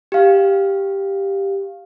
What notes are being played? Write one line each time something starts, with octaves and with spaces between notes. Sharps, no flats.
G4 F5